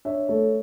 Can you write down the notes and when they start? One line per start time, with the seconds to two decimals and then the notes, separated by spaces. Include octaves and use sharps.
0.05 D4 C#5 E5
0.28 A3 A4 C#5